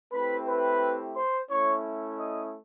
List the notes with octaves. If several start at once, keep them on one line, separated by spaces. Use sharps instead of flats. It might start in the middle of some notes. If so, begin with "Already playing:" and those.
A3 C4 E4 G4 B4 B5
B4 B5
C5 C6
A3 C#4 E4 C#5 C#6
D#5 D#6